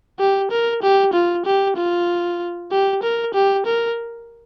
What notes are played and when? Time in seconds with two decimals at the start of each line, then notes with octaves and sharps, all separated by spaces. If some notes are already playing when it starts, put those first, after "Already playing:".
0.19 G4
0.51 A#4
0.82 G4
1.13 F4
1.46 G4
1.76 F4
2.72 G4
3.03 A#4
3.34 G4
3.66 A#4